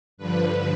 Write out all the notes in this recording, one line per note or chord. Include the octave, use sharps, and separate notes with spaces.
G2 D3 F3 B4